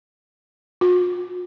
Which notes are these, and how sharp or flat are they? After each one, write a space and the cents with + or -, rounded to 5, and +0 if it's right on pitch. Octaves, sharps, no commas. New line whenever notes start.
F4 +45